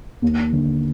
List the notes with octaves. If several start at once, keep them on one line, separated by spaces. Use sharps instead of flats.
D#2
D3